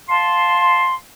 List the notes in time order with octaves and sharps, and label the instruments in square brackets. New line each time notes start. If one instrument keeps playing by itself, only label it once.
[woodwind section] F5 A5 C6